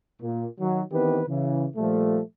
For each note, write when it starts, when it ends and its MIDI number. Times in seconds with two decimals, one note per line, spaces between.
0.21 0.45 46
0.59 0.81 51
0.59 0.81 54
0.92 1.21 51
0.92 1.21 52
0.92 1.21 59
0.92 1.21 60
0.92 1.21 67
0.92 1.21 71
1.27 1.65 49
1.27 1.65 52
1.76 2.19 46
1.76 2.19 53
1.76 2.19 55
1.76 2.19 57